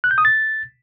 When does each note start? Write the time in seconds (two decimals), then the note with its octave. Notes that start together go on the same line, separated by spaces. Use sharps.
0.04 F#6
0.11 G6
0.18 D#6
0.25 A6